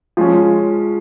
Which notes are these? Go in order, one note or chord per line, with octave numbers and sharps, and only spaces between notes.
F3 G#3 C#4